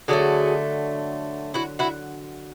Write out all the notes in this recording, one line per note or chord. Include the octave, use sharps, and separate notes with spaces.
D3 F#3 A3 F#4 G#4
E4 F#4
E4 F#4